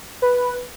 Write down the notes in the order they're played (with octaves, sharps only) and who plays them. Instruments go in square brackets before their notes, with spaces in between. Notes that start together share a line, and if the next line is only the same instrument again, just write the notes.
[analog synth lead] B4